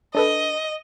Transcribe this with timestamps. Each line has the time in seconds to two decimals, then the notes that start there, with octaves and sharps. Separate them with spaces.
0.15 D4 A4 B4 D#5